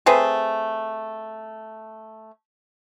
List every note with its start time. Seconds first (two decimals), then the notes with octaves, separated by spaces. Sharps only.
0.06 A3 C4 G#4 B4